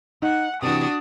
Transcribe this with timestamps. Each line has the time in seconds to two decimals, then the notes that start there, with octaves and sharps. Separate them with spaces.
0.22 D#4 F#5
0.62 C3 E3 D4 F#4 D#6